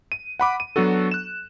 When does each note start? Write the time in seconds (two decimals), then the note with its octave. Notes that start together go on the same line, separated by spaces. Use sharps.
0.12 D#7
0.40 F#5 B5 D6
0.60 D#7
0.76 F#3 B3 D4 F#4 A4
1.11 F#6 E7